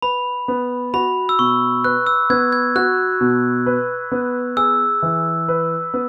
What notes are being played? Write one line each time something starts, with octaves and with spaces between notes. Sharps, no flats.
B4 B5
B3
F#4 B5
E6
B2 C#6
B4 F#6
E6
B3 G#6
G#6
F#4 F#6
B2
B4
B3
G#4 E6
E3
B4
B3